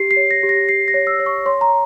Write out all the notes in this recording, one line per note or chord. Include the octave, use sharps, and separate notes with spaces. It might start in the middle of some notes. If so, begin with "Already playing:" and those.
Already playing: G4 C7
C7
C#5
A#6
G4
A#6
G4 C7
A#6
C#5
E6
C#5
C#6
C#5 C6
A#5